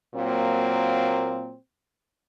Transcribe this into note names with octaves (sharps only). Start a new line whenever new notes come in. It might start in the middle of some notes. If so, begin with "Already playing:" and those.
A#2 F#3 A#3 C4